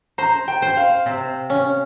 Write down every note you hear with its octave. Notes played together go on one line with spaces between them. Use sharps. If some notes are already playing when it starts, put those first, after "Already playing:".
C5 A#5
G5
C5
F5
C3
C#4